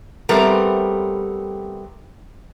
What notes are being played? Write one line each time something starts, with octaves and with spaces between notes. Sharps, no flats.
G3 A3 B3 C4 A#4